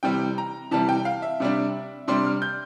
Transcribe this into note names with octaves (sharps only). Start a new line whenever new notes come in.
C3 E3 G3 G5
A#5
C3 E3 G3 A5
G5
F5
E5
C3 G3 D4
C3 G3 D4 C6
F6
G6